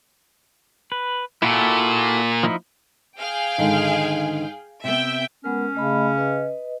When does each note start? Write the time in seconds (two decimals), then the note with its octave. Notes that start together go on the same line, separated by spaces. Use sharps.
0.92 B4
1.42 A#2 E4 F#4 A4
2.43 F3 D#4 E4
3.18 G#4 F5 G5
3.58 G#2 D3 D#3
4.84 C3 B3 E5 G5
5.44 G#3 B3 C#4 A#4
5.75 C#3 A3 D#5 B5
6.17 B4 D#5